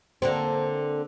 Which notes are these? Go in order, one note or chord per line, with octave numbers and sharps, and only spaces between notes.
D3 A#3 C4